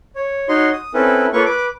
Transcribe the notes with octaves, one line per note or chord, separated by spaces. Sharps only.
C#5
D#4 F#4 C#5 D#5 C6
D#6
C4 C#4 E4 A4 B4
A#3 F4 A4 B4 C#5 C#6
B4 D6